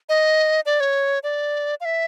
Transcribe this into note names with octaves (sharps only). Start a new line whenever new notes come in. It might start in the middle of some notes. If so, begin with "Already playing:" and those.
D#5
D5
C#5
D5
F5
E5